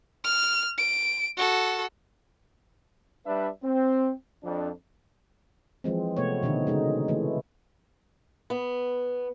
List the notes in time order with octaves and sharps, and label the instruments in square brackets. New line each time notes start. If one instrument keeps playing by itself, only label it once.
[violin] F6
D7
F#4 A4
[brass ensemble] G3 D4 B4 E5
C4
F2 D4
[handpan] E3 F3 G#3 C4
C3 A3 B3 C#5
B2 D3 D#3 D#4
C#3 G#3 D#4
E3 A3
[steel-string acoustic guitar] B3